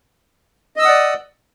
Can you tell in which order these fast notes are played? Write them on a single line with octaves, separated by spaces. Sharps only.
D#5 E6 D#6 F#5 D5